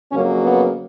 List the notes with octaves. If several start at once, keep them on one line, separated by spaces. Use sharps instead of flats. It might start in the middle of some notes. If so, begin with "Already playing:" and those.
F2 C#3 F#3 A#3 C#4
B3